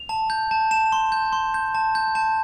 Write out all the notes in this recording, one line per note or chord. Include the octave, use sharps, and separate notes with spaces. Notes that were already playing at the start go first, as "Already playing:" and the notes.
Already playing: F7
A5
G6
A5
A5 E7
C6
G6
C6
G6
A5
G6
A5